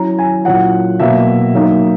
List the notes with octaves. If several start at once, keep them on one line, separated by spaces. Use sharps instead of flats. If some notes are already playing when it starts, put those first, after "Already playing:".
Already playing: F#3 C#4 E4 A#5
G#5
A#2 F#3 C#4 E4 F#5
B2 F#3 A#3 E5
F#3 A#3 D#4